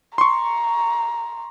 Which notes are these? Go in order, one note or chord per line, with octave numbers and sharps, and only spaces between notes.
A#5 C6 C#6